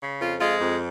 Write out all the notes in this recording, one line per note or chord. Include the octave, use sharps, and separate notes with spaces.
C#3
F2 F4
G#3 F4
F2